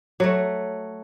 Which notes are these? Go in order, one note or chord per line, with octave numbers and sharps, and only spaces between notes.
F#3 A3